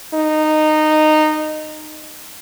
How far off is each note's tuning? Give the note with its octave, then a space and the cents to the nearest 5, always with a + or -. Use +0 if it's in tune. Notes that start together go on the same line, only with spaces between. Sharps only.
D#4 -15